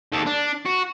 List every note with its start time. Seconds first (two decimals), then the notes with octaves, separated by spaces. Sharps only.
0.12 D#2 A4
0.26 D4
0.65 F#4